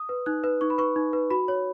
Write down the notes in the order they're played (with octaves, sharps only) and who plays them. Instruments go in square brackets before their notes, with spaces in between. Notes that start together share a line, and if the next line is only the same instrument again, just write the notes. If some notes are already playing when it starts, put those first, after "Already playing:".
Already playing: [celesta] D#6
B4
D#4 F#6
B4
D#4 C#6
B5
B4 C#6
D#4
B4
F#4 B5
C#5